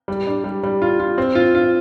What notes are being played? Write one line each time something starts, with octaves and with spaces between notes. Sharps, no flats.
G3
D4
G3
G3
F4
F4
C4
F4
F4